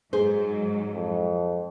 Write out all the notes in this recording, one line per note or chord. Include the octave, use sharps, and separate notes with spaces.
G#2 F#3 G#4 C5
F2